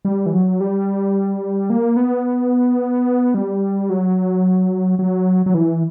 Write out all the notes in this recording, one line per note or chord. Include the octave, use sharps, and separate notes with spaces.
G3
E3
F#3
G3
A#3
B3
G3
F#3
F#3
F#3
E3